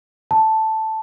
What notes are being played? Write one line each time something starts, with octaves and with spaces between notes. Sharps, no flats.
A5